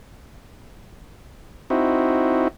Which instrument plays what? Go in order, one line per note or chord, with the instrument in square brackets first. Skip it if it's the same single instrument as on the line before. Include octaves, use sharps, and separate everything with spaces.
[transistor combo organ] C4 D#4 E4 F#4